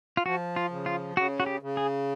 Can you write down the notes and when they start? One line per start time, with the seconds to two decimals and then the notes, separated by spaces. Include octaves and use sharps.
0.17 F4
0.26 F3 F#4
0.56 F4
0.71 C#3
0.86 F4
1.16 C#3 F#4
1.40 F#4
1.46 G4
1.62 C#3
1.77 G#4